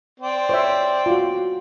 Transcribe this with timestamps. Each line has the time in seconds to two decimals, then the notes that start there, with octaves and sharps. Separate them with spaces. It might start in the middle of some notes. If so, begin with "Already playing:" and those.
0.20 C4 D5
0.49 C5 C#5 E5
1.06 F4 F#4